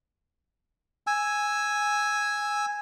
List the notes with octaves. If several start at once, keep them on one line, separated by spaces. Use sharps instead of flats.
G#5 E6